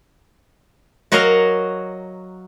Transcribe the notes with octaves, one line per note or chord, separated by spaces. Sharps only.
F#3 F#4 A#4 C#5 D#5 F5